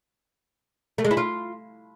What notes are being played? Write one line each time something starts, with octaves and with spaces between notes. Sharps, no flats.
A3
G#3
E4
F4